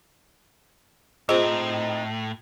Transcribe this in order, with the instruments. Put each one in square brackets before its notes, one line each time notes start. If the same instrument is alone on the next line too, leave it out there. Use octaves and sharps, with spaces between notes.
[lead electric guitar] A2 [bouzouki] C4 D#4 [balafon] F4 G#4